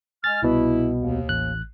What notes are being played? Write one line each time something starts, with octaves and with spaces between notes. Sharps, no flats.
G#3 G#5 F6 A6
C2 B2 E4
D#2
A1 F#6